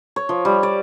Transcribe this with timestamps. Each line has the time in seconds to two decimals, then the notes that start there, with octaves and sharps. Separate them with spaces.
0.16 C#5
0.29 F3
0.45 G3
0.63 D5